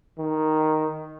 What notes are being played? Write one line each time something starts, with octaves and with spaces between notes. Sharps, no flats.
D#3